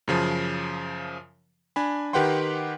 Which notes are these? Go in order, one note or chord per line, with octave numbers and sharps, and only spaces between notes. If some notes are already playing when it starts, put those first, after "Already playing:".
F#2 C#3 F3 A5
D4 G#5 B5
D#3 G4 B4 F#5 G5 C6